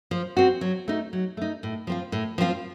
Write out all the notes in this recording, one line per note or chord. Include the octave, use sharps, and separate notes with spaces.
F3
C4 F#4
F#3
A3 D#4
F#3
A3 D#4
A2
F3 C4 F4
A2
F3 C4 F4